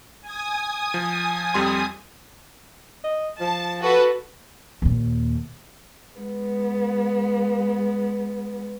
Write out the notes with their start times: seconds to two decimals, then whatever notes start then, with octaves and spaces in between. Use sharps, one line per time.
0.22 G#5 D#6
0.94 F3
1.54 F2 G3 C6
3.04 D#5
3.40 F3 A5
3.81 F#4 A4 B4
4.82 D#2 A#2
6.17 G#3 B3